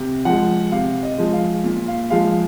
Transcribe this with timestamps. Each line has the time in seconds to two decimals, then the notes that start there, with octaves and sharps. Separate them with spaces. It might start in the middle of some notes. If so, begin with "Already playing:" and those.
Already playing: C3
0.25 F3 G#3 F#5
0.71 C3 F5
1.03 D#5
1.18 F3 G#3
1.33 F5
1.64 A#2
1.88 F5
2.10 F3 G#3 F5